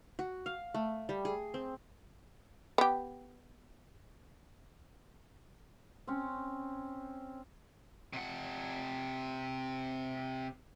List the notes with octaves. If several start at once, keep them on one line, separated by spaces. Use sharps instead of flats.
F#4
F5
A3
G3
G#4
C4
B3 G4
C4 C#4
C3 F#5